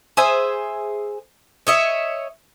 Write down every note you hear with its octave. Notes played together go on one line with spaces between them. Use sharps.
G#4 C5 E5 G#5
C#5 D#5 E5